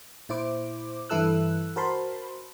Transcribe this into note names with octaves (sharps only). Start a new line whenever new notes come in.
A#2 E4 C5 D6
G2 E3 E4 A4 E6 F#6
F#4 A#4 C5 A5 B5 C6